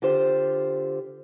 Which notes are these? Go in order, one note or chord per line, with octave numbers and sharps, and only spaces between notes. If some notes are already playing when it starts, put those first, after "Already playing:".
D3 F4 G4 C5